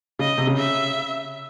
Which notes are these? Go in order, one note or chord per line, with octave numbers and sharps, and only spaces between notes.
C#3 D#5
C3
C#3
E5